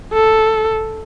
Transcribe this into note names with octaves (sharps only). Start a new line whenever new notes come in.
A4